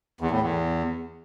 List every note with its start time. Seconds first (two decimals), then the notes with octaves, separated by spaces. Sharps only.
0.21 E2
0.31 A2
0.41 E2